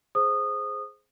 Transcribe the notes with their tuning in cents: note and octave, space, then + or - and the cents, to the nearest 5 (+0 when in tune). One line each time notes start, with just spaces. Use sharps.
G#4 +10 C5 +0 D#6 -20